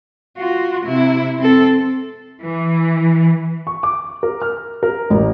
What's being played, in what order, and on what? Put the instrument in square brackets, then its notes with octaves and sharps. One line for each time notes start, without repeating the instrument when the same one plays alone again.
[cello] F4 F#4
C3 E4
C4 A4
[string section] E3
[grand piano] C#6
D6
A#4
F6
A#4
A1